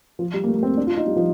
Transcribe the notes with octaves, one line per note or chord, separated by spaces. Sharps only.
F3
G3
A#3
A3
A#3
C4
D4
F4
D#4
G3
F3